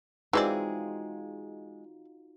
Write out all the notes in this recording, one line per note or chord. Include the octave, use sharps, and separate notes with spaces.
E3 G#3 C4 D#4 F4 F#4 G#4 D5